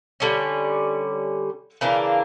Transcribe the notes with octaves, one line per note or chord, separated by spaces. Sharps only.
D3 G3 C#4
C#3 E3 A#3 D4